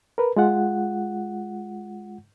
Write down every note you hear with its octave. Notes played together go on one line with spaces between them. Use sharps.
A#4 B4
G#3 F4 F#5